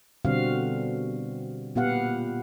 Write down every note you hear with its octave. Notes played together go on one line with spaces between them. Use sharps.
B2 D3 G3 C4 F#4 F5
A#2 B3 G4 F5 F#5